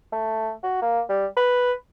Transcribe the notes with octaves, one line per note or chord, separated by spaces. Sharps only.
A3
F#4
A#3
G3
B4